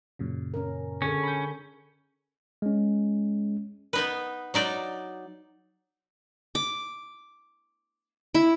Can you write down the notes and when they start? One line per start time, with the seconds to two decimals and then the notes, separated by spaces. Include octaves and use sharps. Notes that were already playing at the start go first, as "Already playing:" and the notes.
0.19 F#2 A#2 C#3
0.54 C#4 A#4
1.02 D3 C#4 G#4 A4
1.23 B5 G6
2.62 G#3 C#4
3.93 B3 D#4 B4
4.54 F#3 D#4 D5
6.55 D6
8.35 E4